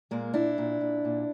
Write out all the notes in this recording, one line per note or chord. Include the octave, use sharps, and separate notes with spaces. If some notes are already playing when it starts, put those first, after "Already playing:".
A#2 G#3 A#3
A#2 D4 E4
A#2
A#2
A#2